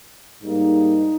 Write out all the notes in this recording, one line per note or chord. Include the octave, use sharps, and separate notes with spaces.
G#2 G3 A#3 D#4